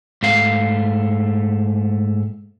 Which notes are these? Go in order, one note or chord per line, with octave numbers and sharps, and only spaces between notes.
G#2 A3 F5